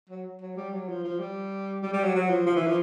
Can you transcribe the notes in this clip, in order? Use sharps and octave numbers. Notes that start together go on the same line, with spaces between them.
F#3
F#3
G3
F#3
F3
F3
G3
G3
G3
F#3
F#3
F3
F3
E3
F3